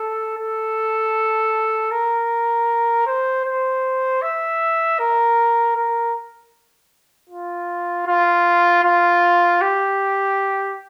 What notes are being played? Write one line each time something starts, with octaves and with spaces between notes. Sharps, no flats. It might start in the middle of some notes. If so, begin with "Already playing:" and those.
Already playing: A4
A4
A#4
C5
C5
E5
A#4
A#4
F4
F4
F4
G4